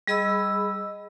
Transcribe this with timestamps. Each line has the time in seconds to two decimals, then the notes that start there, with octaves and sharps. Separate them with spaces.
0.07 G3 G#4 D#5 B5 E6